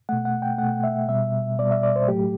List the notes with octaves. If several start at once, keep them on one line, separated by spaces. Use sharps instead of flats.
B2 A3 F#5
F#5
G5
B2 A3 F#5
E5
B2 G3 E5
B2 G3 D5
E5
D5
C5
A2 F#3 A3 G4